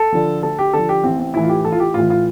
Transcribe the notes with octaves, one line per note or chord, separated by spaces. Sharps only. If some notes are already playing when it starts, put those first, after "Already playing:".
Already playing: A4
D3 F3
D2 A4
G4
D3 F3 A4
G4
A1 C4
C4
A2 E3 E4
F4
G4
A1 A4
F4
G4
A2 E3 F4
F4